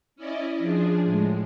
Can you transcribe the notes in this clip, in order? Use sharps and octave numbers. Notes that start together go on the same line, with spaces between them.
C#4 E4 D5 D#5
F3 D4 G#4
A2 G#3